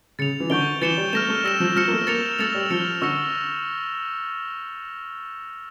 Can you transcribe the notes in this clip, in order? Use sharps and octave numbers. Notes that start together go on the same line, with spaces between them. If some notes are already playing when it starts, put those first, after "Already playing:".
C#3 A6 C#7 F7
E3
D3 C#6 G6 D7 G7
E3 A6 C#7 E7 G7
G3
A3 F6 A#6 E7
A3
G3 E6 A#6 E7
F3
F3 F6 A#6 C#7
A#3
A3
A#3 A6 C#7 F7
A3 E6 A6 C#7 F7
G3
F3 F6 C#7 E7 G7
D3 C#6 E6 A#6 C#7